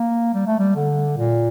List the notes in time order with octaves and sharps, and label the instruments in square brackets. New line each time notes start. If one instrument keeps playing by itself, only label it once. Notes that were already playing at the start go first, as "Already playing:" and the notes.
Already playing: [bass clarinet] A#3
G3
A3
G3
D3
A#2